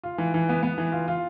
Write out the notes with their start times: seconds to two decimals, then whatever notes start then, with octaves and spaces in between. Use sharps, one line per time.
0.03 F4
0.18 E3
0.34 E3
0.49 B3
0.63 B3
0.78 E3
0.92 F4
1.08 F4